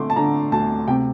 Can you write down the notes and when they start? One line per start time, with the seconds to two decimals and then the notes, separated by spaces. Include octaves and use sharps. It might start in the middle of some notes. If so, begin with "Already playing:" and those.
Already playing: D3 A3 C6 D6
0.10 A5
0.16 D3 A#5
0.52 D2 A5
0.88 C3 G5